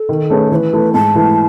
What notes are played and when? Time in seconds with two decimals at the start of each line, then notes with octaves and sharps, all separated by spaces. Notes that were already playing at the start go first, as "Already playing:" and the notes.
Already playing: A4
0.09 D#3
0.30 A3 C#4 G#4 B4
0.52 E3 B4 C#5
0.73 A3 E4 A4
0.93 G#2 A5
1.15 E3 A3 E4 B4